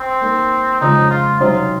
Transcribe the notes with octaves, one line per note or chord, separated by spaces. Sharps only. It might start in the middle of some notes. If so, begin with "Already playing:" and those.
Already playing: C4
A#3 D#4 A#4
F2 C#3 F3 G#3 D#4
F4
C3 F#3 C4 D#4 F4